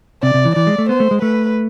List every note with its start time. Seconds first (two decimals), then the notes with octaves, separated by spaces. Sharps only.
0.22 C3 D5
0.34 C3
0.45 E3
0.55 E3 D5
0.67 G#3
0.78 A3
0.89 B3 C5
1.00 A3
1.11 G#3
1.22 A3 B4